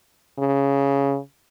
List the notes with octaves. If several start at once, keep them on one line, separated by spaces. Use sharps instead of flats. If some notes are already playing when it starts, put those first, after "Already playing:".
C#3